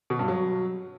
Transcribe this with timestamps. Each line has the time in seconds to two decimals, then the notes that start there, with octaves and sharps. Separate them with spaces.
0.10 B2
0.19 G2
0.28 F#3